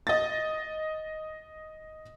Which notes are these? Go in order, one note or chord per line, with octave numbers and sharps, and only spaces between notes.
D#5 A6